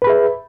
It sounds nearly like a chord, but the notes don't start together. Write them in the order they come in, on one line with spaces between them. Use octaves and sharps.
B4 B5 G#4 E5